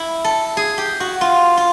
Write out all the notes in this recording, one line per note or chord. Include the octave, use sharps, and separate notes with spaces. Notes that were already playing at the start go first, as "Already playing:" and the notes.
Already playing: E4
A4
G#4
G4
F#4
F4
F4